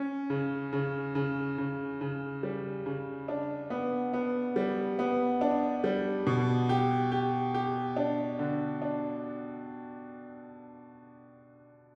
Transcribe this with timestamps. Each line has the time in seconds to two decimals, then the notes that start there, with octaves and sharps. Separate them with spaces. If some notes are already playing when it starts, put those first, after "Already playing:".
Already playing: C#4
0.30 C#3
0.73 C#3
1.15 C#3
1.58 C#3
2.01 C#3
2.43 G3
2.86 C#3
3.28 D4
3.70 B3
4.13 B3
4.56 G3
4.99 B3
5.41 D4
5.84 G3
6.27 B2
6.69 G4
7.11 G4
7.54 G4
7.96 D4
8.39 D3
8.82 D4